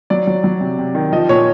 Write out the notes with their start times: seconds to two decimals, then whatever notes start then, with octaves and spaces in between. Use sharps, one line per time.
0.10 F#3 D5
0.27 F#3
0.44 F#3
0.60 C3
0.79 C3
0.95 D#3
1.12 F3 D#5
1.29 A#2 C#5